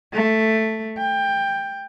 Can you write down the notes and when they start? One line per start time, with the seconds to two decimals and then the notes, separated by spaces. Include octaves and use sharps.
0.13 A3
0.98 G5